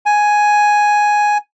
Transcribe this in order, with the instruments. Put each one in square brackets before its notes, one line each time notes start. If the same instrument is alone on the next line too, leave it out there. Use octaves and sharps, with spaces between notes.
[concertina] G#5